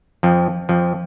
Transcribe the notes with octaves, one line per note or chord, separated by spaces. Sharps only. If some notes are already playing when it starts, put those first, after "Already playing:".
F2 F3
F2 F3